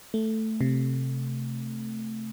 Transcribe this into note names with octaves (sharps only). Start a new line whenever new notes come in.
A3
C3